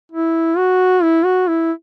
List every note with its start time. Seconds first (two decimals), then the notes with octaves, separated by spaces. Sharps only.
0.12 E4
0.58 F#4
1.03 E4
1.25 F#4
1.48 E4